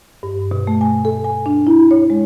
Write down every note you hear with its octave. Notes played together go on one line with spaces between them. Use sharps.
G2
B2
A3
G#5
A4
G#5
D4
E4
C#5
G#3